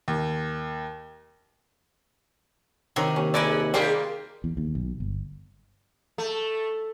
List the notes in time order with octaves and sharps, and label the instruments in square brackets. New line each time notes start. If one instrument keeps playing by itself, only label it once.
[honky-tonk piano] D#2
[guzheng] C3 D#3 [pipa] F#3 A#5
[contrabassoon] D#2 [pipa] C#4
[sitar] G#3 [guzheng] E4 F#5 G#5 [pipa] A#4 B4 D5
[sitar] G#2 G4 G#4 [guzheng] G3 A#3 F4 [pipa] D5 G5
[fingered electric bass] E2
D#2
B1
G1
[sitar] A3